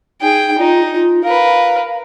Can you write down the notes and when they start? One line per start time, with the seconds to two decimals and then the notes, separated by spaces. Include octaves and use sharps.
0.21 D#4 G#4 G5
0.58 D#4 F4
0.94 F4
1.24 A#4 B4 F5